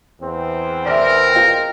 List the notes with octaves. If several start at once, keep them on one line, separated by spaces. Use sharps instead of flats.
E2 C4
A#4 D5 E5
F4 D#5 G5